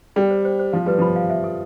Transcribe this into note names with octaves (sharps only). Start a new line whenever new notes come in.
G3 G5
C5
C5
C5
F3 F5
G3 B4
F3 B5
F5
E5
A4